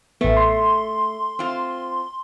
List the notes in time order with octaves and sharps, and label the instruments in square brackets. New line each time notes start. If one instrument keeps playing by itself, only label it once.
[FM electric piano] A1 B3 [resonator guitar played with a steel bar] A3
[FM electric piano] C6
[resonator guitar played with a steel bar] C4 F4